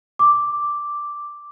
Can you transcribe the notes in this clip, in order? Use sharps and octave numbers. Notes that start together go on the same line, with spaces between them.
D6